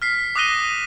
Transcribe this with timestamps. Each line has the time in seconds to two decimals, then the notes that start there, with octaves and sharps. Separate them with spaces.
0.02 F6 B6 C7
0.35 D6 D#6 F#6 A#6 D#7 G7